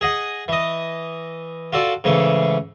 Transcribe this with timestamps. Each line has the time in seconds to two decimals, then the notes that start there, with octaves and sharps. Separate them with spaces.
0.01 G#4 D#5 F#5
0.48 E3 D#5
1.72 F4 F#4 A4 D5
2.04 G#2 C#3 E3 A3